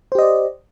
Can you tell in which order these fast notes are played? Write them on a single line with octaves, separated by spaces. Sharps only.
C5 G4 D#5 D5